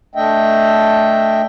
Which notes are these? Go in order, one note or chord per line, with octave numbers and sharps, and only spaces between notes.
A3 D4 D#5 E5 G5